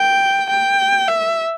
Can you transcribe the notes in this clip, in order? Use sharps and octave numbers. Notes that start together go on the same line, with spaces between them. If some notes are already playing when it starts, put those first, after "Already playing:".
Already playing: G5
G5
E5